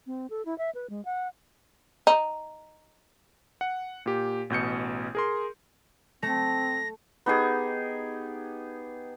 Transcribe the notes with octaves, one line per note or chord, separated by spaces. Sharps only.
C4
A4
E4
E5
B4
G#3
F#5
D#4
F#5
A#2 G4
A1 B2 G6 C#7
G#4 A#4 C6
A3 C4 A#6
B3 D#4 G4 G#4